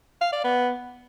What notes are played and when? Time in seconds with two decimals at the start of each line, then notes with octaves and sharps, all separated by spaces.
0.22 F5
0.33 D5
0.44 B3